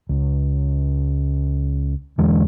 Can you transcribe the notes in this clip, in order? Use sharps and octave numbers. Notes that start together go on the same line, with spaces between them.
C#2
E2 D3 E3 G#3